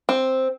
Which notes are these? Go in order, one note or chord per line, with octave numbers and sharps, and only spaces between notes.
C4